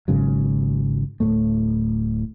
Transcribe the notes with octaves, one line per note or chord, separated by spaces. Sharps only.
G#1 G#2 C#3 F#3
D1 A2 A3